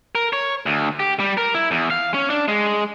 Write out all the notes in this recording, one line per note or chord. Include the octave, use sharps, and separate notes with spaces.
A#4
C#5
D2
G4
G3
A#4
E4
E2
F5
C#4
D4
G#3